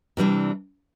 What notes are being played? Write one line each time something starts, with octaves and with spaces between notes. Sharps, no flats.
C3 E3 G3 B3 D4